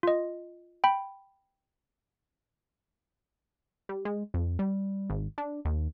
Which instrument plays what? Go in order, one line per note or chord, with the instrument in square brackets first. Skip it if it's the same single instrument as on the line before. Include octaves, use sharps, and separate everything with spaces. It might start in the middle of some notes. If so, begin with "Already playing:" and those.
[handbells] F4 D#5
G5 B5
[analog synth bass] G3
G#3
F2
G3
G#1
D4
D#2